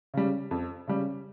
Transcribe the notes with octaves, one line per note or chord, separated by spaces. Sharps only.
C#3 G3
F2
C#3 G3